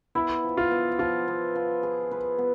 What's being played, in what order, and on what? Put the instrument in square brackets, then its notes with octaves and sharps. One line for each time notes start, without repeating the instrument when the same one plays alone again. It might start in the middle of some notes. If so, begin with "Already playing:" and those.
[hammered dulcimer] B3 [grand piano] E4
[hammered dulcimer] F3
[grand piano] F4
[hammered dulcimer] B3
[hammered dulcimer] F3 [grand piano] F4
[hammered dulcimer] B3
F3
G#4
B4
B3